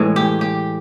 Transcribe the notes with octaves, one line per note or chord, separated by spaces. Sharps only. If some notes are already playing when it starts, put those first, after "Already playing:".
Already playing: A2 E3 G#3
G4
G4